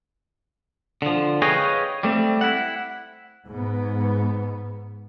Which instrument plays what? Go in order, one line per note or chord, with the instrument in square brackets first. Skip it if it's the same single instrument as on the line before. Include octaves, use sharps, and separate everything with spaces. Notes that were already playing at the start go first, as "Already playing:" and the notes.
[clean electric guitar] D3 F3
G#4 B4 C#5 D#5 F5 G5
G3 A3 C4
E4 F#5
[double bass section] G#2 B3